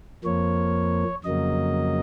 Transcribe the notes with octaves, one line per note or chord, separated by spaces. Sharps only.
F2 F3 A#3 C#5
F2 C#3 F#3 A#3 D#5